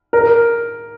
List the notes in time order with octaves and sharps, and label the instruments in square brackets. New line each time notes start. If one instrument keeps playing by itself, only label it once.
[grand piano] A#4